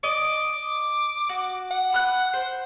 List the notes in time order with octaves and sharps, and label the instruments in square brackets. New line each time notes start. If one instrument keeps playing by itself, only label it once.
[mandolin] D#5 [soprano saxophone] D6
[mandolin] F#4
[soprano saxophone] F#5
[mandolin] B5 F6 F#6
C5